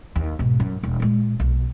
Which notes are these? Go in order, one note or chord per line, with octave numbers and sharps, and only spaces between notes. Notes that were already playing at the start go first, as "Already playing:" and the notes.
D#2
G#2 B2
F#2
E1
A#2 G#3
B1